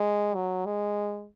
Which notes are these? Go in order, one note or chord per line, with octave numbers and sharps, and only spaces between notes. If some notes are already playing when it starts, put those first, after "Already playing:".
Already playing: G#3
F#3
G#3